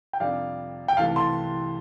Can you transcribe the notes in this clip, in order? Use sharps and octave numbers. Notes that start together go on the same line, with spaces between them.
G5
F2 C3 G3 D4 A4 D5 F5
G5
C2 C3 E3 A3 F5 A5
A5 C6